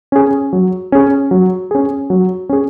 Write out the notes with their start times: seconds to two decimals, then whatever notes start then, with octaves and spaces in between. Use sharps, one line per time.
0.12 C#4 G#4
0.53 F#3
0.92 C#4 G#4
1.31 F#3
1.71 C#4 G#4
2.10 F#3
2.49 C#4 G#4